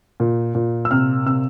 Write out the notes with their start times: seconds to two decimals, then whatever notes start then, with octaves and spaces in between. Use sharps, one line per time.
0.20 A#2
0.55 A#2
0.85 E6
0.91 C3 F6
1.26 C3 E6